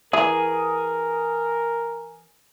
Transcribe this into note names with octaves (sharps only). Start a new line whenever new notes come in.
E3 G#4 A#4